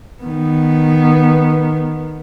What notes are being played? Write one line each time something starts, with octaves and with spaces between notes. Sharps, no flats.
D#3 B3